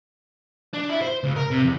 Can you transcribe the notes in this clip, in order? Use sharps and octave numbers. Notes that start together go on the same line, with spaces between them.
D4
E4
C5
C#2
A#4
C3
E2